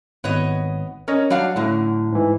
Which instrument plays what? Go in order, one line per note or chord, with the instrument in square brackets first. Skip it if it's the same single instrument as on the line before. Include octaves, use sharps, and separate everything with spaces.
[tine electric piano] G#1 [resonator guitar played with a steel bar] B3 C#5 D#5
[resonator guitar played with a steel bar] C#4 [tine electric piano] A#4 C#5 D#5
[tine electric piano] F#3 F#5 [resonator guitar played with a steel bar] G3 D4 F5
[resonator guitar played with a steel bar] F#2 D3 [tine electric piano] A2 A3
[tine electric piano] G#2 E3